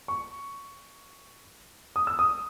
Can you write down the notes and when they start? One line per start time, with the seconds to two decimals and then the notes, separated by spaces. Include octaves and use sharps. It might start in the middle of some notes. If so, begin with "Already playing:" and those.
0.08 C#6
1.96 D#6
2.07 E6
2.19 D#6